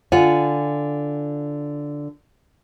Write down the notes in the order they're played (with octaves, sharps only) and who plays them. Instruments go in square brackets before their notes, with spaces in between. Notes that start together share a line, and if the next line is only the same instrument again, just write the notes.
[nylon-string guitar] D3 F4 F#5 G#5